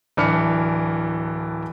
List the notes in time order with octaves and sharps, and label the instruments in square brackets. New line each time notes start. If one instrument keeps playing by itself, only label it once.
[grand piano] D1 E3 D4 B5 F6 C#7